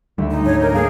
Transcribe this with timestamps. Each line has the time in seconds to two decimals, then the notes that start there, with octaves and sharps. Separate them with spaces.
0.18 D2 G3 E5
0.31 D#4
0.46 G#2 D4 C#5
0.62 A#4
0.74 G3 A#3 G#4 F5